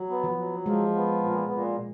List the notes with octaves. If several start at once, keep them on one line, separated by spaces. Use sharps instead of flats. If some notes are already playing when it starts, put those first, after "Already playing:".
Already playing: F#3
B3
F3
F#3
F3 G#3
B3
A#2
A#2